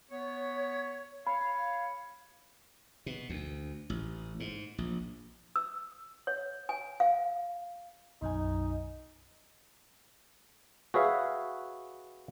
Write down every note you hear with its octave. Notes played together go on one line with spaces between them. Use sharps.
B3 C#5
C#5 F5 B5
B2
D2
A1
G#2
A#1
E6
C#5
G#5
F5
B1 F#2 D#4 G#5
F#4 G#4 B4 C#5 E5 F5